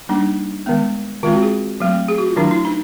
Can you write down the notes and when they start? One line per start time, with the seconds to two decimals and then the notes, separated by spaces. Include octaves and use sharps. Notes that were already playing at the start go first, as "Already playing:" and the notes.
0.09 G3 A#3 D4 D#4
0.66 D#3 G#3 B3
1.23 D#3 G#3 C4 F4
1.33 F#4
1.42 G#4
1.80 F#3 A3 C4
2.08 G#4
2.18 F#4
2.27 F4
2.36 D#3 F#3 A3 D4 E4
2.51 E4
2.65 D#4